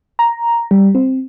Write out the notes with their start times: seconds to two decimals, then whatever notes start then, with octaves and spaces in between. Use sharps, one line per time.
0.19 A#5
0.71 G3
0.95 C4